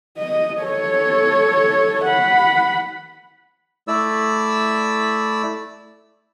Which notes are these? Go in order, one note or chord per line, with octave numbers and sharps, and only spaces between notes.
D#5
A4 C#5
F#5 B5
A3 E4 D5 E6